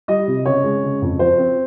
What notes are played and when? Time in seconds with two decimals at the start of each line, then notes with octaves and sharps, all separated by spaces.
0.08 G3 D#5
0.27 C3
0.46 C#3 C#5
0.64 G#3
0.83 C#3
1.02 F2
1.19 F3 C5
1.38 C4